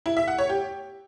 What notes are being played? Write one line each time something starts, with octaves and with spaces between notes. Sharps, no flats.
E4
E5
F#5
C#5
G4